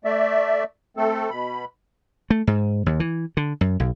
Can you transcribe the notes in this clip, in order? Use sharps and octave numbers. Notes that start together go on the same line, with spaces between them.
A3 D5 E5
A3 C4 A4
B2 B5
A3
G#2
D#2
E3
D3
F#2
B1